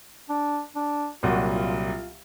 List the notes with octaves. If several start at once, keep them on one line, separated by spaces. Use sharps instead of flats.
D4
D4
C2 A#2 F#3 F#4
F4
F4